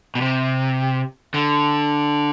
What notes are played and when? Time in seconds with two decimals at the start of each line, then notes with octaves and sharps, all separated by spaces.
0.15 B2
0.21 C3
1.34 D3